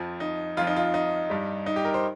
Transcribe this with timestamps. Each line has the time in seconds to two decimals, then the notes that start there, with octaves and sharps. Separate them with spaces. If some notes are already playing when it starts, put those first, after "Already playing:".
Already playing: F2 F3
0.20 D#4
0.57 F2 F3 F4
0.67 D#4
0.77 F4
0.94 D#4
1.30 G2 G3
1.66 D#4
1.76 G4
1.85 A#4
1.94 C5